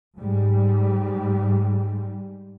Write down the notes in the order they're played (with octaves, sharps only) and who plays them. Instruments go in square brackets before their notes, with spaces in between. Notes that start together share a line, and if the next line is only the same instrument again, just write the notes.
[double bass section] G#2 G3